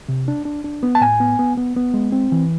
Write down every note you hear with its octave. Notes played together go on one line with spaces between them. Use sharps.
C3
D4
D4
D4
B3
A5
A2 G#5
B3
B3
B3
B3
G#3
C4
E3